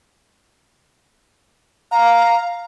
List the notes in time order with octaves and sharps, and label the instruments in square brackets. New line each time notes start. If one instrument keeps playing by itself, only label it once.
[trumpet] F5 [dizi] A#5